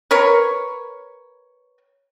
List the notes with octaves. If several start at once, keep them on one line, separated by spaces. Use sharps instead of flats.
A#4 B4 C#5